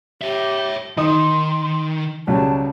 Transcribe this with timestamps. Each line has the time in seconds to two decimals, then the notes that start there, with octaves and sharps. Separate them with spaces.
0.22 G4 C#5 E5
0.97 D#3 D#4 C6 D#6
2.27 C#2 F#3 G3 A5